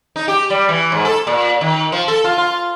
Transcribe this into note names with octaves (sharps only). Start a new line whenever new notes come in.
D#4
G4
G3
E3
G#2
A4
A#2
D#3
F3
A4
F4
F4